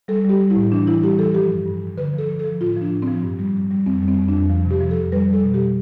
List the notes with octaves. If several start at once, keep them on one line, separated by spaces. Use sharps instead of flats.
G3 A4
G3 G4
G3
E4
A2
E3 D4
E3 E4
G3 G4
E3 A4
F3 G4
G2
G2
G2
D3 B4
F3 A4
F3
A4
F3
A2 F4
F3 D4
A2
C4
F3
G2
G3
G2
G3
F2 C4
G3
C4
F2
D4
F2
F3
C3
G4
F3
A4
F2
G3 B4
G3
A4
B2
G4
G3